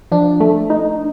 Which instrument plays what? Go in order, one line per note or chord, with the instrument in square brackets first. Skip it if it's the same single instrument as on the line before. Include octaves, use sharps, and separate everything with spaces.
[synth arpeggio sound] F3 [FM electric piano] D4
[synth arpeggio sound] A3
D#4